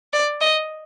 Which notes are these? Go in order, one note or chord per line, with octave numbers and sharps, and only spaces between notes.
D5
D#5